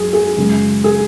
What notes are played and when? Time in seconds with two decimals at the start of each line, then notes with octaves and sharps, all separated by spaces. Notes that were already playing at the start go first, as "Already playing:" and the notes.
Already playing: F#2 G#4
0.13 G#4
0.37 F#2 C#3 G#3
0.84 G#4